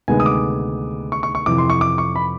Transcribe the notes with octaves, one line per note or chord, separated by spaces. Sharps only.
D2 C3 D#3 G#3 B3 G#5
D#6
D6
C#6
C#6
C#6
F2 C3 E3 D6
C6
C#6
D6
C#6
B5